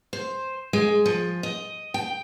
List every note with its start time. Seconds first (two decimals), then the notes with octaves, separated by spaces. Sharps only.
0.13 C5
0.73 G#3
1.06 F3
1.43 D#5
1.94 G5